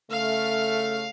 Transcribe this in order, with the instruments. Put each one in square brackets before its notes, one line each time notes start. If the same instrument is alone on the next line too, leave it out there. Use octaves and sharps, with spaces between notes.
[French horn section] C#3 A3 [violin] F5 F6